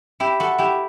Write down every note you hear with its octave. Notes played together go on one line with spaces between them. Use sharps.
E4 G4
F#4 A4
E4 G4